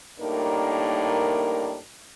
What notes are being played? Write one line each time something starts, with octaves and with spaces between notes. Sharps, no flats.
A2 G3 A#3 D4 D#4 A#4